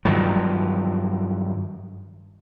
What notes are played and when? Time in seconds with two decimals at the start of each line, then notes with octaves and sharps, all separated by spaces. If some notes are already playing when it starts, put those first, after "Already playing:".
0.05 G2 D#3 F3 F#3